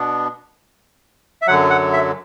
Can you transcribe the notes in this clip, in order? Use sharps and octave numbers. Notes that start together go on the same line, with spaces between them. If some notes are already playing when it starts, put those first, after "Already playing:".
Already playing: B2 B3 D4
E5
F#2 D3 F#3 F#5
F#5
E5